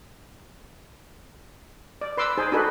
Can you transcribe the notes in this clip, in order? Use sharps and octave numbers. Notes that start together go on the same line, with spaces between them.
D5
B4 C6 D6 E6
D#4 G#4 C5
D4 D#4 F#4 G#4 A4 B4